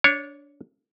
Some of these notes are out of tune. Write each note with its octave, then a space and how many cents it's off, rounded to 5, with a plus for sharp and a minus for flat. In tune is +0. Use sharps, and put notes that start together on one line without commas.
D4 -20 C#5 +0